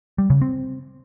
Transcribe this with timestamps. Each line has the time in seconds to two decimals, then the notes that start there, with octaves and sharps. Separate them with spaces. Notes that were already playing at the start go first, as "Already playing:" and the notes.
0.18 G3
0.30 C#3
0.42 C4